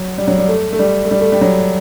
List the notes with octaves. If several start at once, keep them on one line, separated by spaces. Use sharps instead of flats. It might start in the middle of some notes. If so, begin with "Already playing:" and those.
Already playing: F#3
G3
F#3
G3
A3
A3
G3
A3
G3
A3
G3
F#3